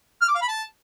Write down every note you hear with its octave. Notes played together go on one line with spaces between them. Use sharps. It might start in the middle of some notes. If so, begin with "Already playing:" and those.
F6
D6
F5
B5
A5